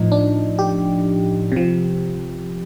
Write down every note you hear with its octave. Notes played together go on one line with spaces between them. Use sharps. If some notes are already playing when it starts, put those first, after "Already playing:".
Already playing: A2 F3 D#4
D4
G4
C3 F3